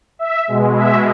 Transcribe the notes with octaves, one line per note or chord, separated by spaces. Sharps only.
E5
B2 G#3
E5